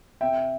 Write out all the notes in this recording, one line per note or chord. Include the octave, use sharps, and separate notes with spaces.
C3 E5 G5